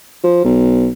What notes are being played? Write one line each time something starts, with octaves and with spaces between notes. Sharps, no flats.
F3
B1